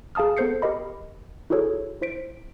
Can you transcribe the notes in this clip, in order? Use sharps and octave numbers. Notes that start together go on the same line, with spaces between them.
G#4 F5 A5 D#6 F6
B3 A4 C5 G6 C7 C#7
G4 A#4 D#5 B5
E4 F#4 G#4 A4 C#5
E4 C5 B6 D7